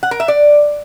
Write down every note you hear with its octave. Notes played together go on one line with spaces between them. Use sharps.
F#5
A#4
E5
D5